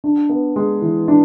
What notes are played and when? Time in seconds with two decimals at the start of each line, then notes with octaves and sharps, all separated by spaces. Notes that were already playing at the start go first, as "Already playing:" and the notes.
0.04 D4
0.29 B3
0.56 G#3
0.82 E3
1.08 D4